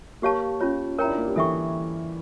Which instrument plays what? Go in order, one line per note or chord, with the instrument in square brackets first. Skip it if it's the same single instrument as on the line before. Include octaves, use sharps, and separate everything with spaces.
[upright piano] A#3 [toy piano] G4 C#5 F5 A5 C#6
[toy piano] C#4 F4 C#5
[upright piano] E4 F4 [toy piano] A#4 C#5 G5 A#5
[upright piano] D4
A#3
G3
[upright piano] E3 [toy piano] A4 E5 G5 C#6